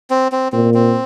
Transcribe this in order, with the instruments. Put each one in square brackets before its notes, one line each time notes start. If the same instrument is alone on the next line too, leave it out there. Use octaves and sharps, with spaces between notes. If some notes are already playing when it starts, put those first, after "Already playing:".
[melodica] C4
C4
[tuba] A#2 [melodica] C4
[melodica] C4